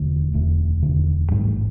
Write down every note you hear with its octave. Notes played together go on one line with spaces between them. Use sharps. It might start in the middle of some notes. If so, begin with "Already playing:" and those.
Already playing: E1 D2 D3
E1 D2 D3
E1 D2 D3
A1 G#2 G3 A3